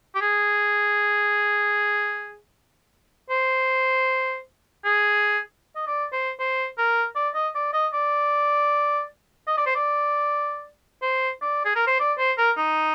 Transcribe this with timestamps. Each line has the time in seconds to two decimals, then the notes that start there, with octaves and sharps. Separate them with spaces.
0.15 G4
0.21 G#4
3.30 C5
4.85 G#4
5.75 D#5
5.87 D5
6.12 C5
6.39 C5
6.78 A#4
7.15 D5
7.35 D#5
7.55 D5
7.73 D#5
7.93 D5
9.47 D#5
9.57 D5
9.66 C5
9.75 D5
11.02 C5
11.41 D5
11.65 G#4
11.76 A#4
11.87 C5
11.99 D5
12.18 C5
12.38 A#4
12.57 D#4